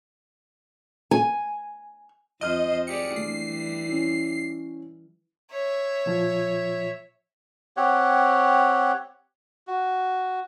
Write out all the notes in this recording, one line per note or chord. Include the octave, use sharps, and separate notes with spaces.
G#5
F2 C5 D#5 E5 F6
G4 G#4 D5 C#7
E3 G3 A3 D4 C7
C#4 E4
C#5 E5
A#2 F3 F4
C4 G4 C#5 F#5
F#4